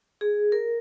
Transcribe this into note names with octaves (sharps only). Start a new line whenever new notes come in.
G#4
A#4